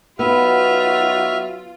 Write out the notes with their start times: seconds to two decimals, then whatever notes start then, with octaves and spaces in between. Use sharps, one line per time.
0.19 F#3 B3 D#4 F4 F#4 E5 F6